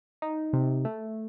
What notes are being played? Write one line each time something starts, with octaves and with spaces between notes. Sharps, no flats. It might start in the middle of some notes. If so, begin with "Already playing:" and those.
D#4
C3
A3